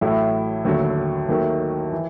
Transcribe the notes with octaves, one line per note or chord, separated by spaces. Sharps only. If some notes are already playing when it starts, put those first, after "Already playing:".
A1 A2 F#3 A3 E4
D#2 D3 F#3 A3
D#2 D#3 F#3 A3
E3